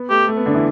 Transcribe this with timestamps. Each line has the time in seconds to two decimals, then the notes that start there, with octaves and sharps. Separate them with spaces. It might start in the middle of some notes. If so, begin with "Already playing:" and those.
Already playing: B3
0.10 A3 G4
0.28 A3
0.36 B3
0.46 D3 D4
0.54 E3 E4